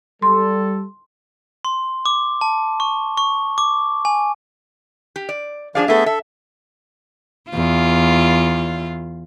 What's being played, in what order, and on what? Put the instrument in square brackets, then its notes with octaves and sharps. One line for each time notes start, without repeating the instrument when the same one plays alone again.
[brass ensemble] G3 A4 [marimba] C6
[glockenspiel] C6
D6
A5
C#6
C#6
D6
G#5
[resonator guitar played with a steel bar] G4
D5
[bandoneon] F3 D5 [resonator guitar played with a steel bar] D4 G#4 F5
[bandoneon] A3 B3 E5 [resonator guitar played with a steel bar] G#4 A4
[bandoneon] A4 [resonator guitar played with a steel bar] E5
[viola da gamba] E2 F4